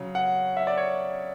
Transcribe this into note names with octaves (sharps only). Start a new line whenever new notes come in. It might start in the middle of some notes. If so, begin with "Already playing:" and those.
Already playing: C#3 F#3
F#5
E5
D5
C#5